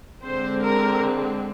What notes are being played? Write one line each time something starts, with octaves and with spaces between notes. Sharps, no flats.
D3 G#3 C4 C5
A#4